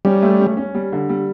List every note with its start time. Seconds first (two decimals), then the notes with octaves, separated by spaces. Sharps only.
0.05 G3 C#4
0.22 A3
0.39 C#4
0.57 C#4
0.75 G3
0.92 D3
1.09 G3